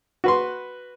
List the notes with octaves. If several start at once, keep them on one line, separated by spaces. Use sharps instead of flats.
F#4 B4 C6